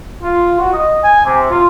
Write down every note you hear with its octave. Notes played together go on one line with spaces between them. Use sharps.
F4
F#4
D#5
G#5
C3
F4